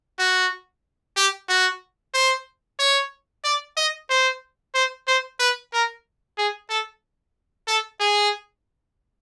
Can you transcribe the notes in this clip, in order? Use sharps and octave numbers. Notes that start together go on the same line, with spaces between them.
F#4
G4
F#4
C5
C#5
D5
D#5
C5
C5
C5
B4
A#4
G#4
A4
A4
G#4